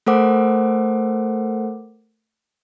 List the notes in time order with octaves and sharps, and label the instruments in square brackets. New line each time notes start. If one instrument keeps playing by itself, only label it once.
[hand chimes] A3 A4 A#4 C5 F#5 D6